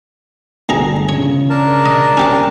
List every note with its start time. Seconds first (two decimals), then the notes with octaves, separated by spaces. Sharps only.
0.69 G1 D2 G#4 A#5
1.09 C#3 C#5
1.50 D4 A#4 A5
1.85 D#5
2.17 C#4 G4 C5